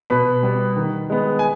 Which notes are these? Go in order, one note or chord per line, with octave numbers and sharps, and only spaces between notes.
B2 B4 B5
G3 B3
D#3
G#3 B3
G#5